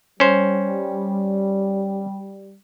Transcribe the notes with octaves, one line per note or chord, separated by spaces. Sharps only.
G3 C#4 C5